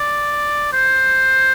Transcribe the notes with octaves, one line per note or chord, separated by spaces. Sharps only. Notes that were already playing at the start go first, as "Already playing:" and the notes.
Already playing: D5
C5